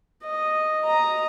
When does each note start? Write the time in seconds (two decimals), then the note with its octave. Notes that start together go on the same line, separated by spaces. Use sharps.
0.24 D#5
0.85 D#5 A#5